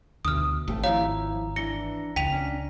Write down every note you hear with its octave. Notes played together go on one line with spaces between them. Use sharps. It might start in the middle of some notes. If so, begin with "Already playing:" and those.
D2 B2 D#6 F6
G#1 A3 G4 G5
F3 E4 C#5 F5 A#5
E3 D4 A#6 C#7 G7
C#2 G5 B6 D#7 F7
C#4 D4